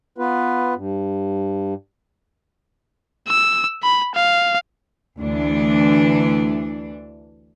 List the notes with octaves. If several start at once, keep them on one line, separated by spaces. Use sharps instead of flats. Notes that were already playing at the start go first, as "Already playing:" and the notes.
B3 F4 B4
G2
E6
B5
F5
D2 E3 D4